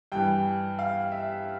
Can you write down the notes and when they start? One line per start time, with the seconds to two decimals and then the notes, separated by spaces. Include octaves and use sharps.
0.12 G2 E3 G5
0.79 F5
1.12 E5